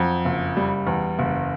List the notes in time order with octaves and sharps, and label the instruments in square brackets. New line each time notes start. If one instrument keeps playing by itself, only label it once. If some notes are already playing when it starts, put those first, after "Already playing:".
Already playing: [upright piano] F2 F#3
F#1
G3
E2
F#1